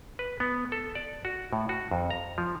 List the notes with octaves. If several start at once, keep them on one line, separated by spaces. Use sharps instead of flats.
B4
B3
A4
D5
F#4
A2
F#4
F2
A#5
F3